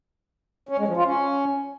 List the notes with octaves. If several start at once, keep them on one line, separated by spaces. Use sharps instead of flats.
C#4
G#3
F3
F4
C#4